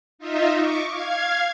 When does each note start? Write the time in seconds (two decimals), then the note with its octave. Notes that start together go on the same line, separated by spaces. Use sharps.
0.19 D#4 F4 D#5 E5
0.56 C#6 D6
0.90 F5 G#6